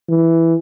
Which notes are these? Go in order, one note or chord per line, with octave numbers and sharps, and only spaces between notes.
E3